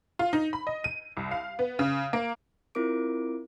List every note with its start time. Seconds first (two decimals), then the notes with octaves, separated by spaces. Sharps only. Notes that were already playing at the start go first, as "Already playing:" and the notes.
0.19 F4
0.33 D#4
0.53 B5
0.67 D#5
0.84 D#7
1.17 C2
1.31 F5
1.59 B3
1.79 C#3
2.13 A#3
2.75 C4 E4 F4 A#4 D6 D7